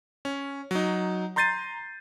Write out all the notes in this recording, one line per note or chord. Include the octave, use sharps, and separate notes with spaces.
C#4
F#3 D#4
A#5 C6 G6 A6 C7 D#7